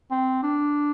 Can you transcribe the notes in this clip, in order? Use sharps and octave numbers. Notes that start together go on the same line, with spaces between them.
C4
D4